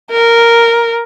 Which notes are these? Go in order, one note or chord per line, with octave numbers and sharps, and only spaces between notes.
A#4